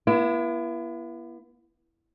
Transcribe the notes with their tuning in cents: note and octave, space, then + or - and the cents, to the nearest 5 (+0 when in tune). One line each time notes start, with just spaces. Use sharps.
B3 -40 E4 +30